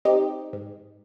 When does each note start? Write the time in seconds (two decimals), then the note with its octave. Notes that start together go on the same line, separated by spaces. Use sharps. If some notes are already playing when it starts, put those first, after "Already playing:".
0.05 C4 D#4 G4
0.53 G#2